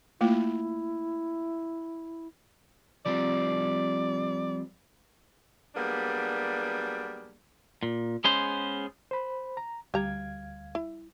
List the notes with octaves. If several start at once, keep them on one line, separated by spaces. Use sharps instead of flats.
A3 A#3 E4 F4
F3 G3 C4 D5
F#3 G3 A#3 B3 D4 G#4
A#2
G#3 B3 C#4 G#4 C5
C5 B5
A#5
D2 G3 G4 F5 A#5 G#6
E4